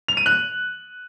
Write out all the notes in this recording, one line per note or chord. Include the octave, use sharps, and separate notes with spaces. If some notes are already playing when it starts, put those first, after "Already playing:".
F7
D#7
F#6